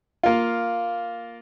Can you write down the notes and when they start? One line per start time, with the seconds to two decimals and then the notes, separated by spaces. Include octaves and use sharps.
0.23 A#3 F4